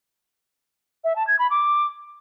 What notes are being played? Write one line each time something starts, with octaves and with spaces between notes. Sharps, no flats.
E5
A5
G#6
B5
D6